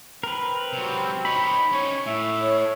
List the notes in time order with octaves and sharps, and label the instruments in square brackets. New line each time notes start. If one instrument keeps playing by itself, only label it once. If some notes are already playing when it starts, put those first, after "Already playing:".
[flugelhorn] C4 [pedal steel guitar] A#4 B4
[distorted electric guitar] C3 F#3
[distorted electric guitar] D#4 C#5 [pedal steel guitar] B5
[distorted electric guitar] C#4 D#4 [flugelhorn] C#5
[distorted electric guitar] A2 [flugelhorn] E5
[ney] C#5